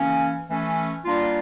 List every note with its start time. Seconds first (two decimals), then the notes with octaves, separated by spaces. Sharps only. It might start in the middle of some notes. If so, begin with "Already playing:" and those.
Already playing: E3 A#3 C#4
0.48 E3 A3 C#4
1.05 G3 A#3 D4 F4